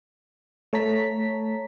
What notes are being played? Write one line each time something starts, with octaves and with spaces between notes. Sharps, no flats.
A3 C#5 A5 A#5 B6